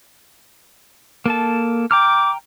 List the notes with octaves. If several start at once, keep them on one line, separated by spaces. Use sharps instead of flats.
A#3 A4 A5
G5 A#5 D6 F6